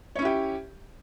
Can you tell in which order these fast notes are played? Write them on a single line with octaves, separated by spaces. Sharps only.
C#5 C#4 E4 G4